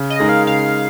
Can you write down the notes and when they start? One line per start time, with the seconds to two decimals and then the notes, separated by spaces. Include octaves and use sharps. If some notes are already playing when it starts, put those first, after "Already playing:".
Already playing: C#3
0.10 D#5
0.20 G#3 D#4 A#4
0.29 F5
0.47 C#3 F5